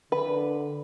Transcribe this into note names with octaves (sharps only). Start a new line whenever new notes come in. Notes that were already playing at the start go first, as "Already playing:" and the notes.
D3 B4